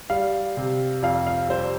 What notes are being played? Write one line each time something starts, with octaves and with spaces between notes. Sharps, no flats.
G3 F5
C3
F2 F5
F5
G3 C5